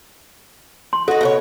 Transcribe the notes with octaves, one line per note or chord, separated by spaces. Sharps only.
C6
D#4 F#4 A4
B2 F#4 C#5